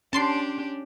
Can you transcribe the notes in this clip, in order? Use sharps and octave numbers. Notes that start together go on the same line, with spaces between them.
C#4 D4 G4 A5 C6 C7